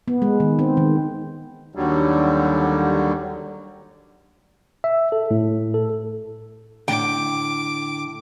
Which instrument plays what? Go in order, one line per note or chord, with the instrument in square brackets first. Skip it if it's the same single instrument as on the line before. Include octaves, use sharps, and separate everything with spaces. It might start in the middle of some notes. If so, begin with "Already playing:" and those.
[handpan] B3
G#3
D#3
C4
D#3
[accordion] D#2 D3 F#3 G3
[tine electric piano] E5
A4
A2
A4
[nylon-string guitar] A2 [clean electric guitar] D3 [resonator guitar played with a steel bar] G5 [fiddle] D6